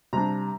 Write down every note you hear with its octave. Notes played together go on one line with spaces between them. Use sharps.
C3 G3 D4 A#5